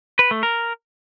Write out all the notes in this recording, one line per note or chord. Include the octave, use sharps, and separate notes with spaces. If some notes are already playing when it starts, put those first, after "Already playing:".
B4
A3
A#4